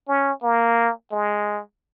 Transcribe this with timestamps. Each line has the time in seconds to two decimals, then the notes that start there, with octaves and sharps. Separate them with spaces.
0.08 C#4
0.43 A#3
1.12 G#3